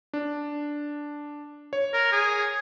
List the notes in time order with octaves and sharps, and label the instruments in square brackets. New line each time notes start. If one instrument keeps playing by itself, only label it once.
[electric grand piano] D4
C#5
[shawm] A#4
G#4